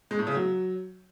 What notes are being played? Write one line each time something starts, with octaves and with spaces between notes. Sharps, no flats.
G#3
A2
C#3
F#3